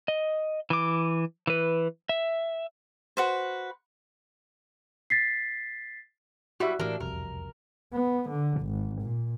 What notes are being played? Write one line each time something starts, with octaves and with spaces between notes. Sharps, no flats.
D#5
E3 D6
E3 B4
E5
F#4 B4 C5
A6 B6 C7
G3 E4 F#4 E5
A2 C3 E3 A#3 D4
E1 C2 F2 A#4
B3
D3
G#1
A#2